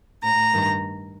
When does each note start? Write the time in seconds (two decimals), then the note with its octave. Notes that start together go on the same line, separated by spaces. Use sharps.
0.23 A2 A#5
0.53 G2 D#3